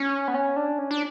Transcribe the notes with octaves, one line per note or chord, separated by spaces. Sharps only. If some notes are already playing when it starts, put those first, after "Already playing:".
Already playing: C#4
B3
C#4
D4
C#4
D4